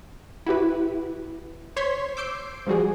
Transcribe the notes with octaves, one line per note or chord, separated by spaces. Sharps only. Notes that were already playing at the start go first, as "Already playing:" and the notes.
E4 F#4 G4 B4
C5 C#5 C6 C#6 G#6 B6
D6 E6 G6 C7 D7
F3 G3 F#4 G#4